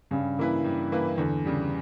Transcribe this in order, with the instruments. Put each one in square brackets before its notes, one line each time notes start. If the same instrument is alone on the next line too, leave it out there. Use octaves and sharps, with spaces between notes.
[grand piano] G2 [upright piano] C#3
[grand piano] E3 A#3 E4 B4
G2
E3 A#3 E4 B4
[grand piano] E2 [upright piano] D3
[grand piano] C#3 G3